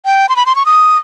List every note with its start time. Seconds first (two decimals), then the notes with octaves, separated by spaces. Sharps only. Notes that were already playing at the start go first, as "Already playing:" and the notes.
0.05 G5
0.29 C6
0.36 B5
0.46 C6
0.56 C#6
0.66 D#6